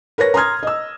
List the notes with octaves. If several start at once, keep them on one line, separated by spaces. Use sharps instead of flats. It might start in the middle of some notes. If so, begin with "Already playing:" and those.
A#4 B4 C#5 A#6
A#5 C6 D#6 F6 G#6
D#5 E6